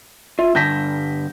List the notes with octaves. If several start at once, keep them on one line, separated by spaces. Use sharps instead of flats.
F4 E5
G2 D3 A5 G6 A#6 B6